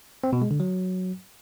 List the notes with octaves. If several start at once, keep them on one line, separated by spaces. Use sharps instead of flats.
C4
B2
G#3
D3
F#3